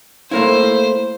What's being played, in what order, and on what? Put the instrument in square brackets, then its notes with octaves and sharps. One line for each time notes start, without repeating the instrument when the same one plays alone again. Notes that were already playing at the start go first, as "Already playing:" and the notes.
[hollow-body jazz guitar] A3 A#3 E4 [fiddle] C5